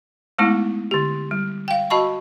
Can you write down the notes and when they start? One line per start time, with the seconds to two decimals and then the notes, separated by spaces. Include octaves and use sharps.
0.38 G#3 A3 B3 D#4 E4
0.91 D3 G4
1.31 G3
1.68 F5 G5
1.90 F#4 D#5 A5 B5 C#6